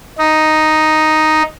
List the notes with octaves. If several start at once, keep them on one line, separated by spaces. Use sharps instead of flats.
D#4